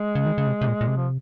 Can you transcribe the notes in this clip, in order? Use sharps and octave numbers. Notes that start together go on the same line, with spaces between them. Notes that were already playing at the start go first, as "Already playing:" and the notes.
Already playing: G#3
C#3
D#3
C#3
C3
C3
A#2
A#2
C3
F3